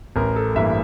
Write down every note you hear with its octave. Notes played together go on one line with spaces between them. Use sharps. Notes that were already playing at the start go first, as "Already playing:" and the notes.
A1 A#4
A4
G2 E3 A#3 E5